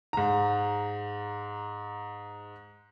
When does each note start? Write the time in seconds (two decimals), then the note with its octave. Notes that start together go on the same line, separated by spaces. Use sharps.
0.13 G#2 A#5